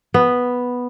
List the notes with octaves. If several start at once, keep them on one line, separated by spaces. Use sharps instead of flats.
B3